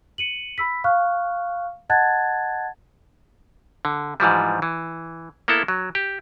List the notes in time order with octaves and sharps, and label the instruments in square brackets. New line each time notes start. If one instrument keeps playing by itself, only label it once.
[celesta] C#7 D#7 F#7
B5 E6 B6
F5 C#6 F6 F#6
D#5 F#5 A5 F#6 G#6 A6
[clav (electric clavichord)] D3
G#2 E3 F3 G3
E3
A#3 B3 E4 A4
F#3
G4